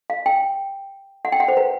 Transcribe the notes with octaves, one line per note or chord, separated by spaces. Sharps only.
F5
G5
F#5
G5
F#5
C5
B4